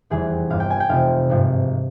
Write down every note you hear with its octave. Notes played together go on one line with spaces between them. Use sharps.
F1 E2 E3 G3 G#4
G1 G2 G3 F5
G5
G#5
G5
F1 F2 C3 F3 F5
G#1 G2 F3